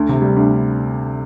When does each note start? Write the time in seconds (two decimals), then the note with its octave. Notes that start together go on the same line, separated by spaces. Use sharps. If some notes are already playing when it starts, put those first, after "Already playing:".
Already playing: D2
0.09 C3
0.22 G3
0.36 D2